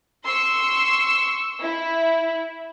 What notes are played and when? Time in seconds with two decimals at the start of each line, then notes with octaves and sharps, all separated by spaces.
0.25 C6 C#6 E6
1.59 E4